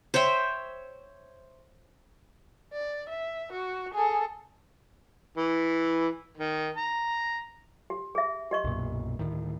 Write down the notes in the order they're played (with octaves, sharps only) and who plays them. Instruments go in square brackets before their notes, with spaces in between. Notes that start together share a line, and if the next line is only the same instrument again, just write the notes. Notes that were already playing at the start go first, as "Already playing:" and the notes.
[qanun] C5 C#5 E5 G5
[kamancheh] D5
E5
F#4
G#4 A4
[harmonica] E3
D#3
A#5
[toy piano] G4
G#4 E5
G4 D#5 C#6
[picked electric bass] B1 F#2 A#2
D2 A2 D#3